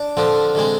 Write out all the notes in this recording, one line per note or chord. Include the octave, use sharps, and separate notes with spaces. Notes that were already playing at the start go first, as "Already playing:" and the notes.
Already playing: D4
D3 F3 C4
D3 G#3 C4